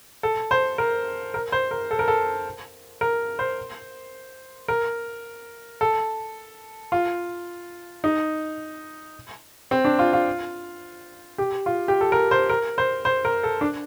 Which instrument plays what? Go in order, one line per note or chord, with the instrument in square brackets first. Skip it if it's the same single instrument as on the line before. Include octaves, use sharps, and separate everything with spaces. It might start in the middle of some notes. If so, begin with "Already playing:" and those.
[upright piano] A4
C5
A#4
A#4
C5
A#4
A4
A#4
A4
A#4
C5
A#4
A4
F4
D#4
C4
D4
F4
F4
G4
F4
G4
A4
A#4
C5
A#4
C5
C5
A#4
A4
D4